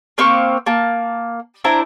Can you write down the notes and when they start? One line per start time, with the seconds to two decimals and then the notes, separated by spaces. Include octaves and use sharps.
0.18 A#3 C4 F5 C#6
0.66 A#3 A5
1.64 D4 E4 C5 A#5